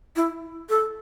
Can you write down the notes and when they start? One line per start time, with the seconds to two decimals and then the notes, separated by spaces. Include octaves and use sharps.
0.16 E4
0.69 A4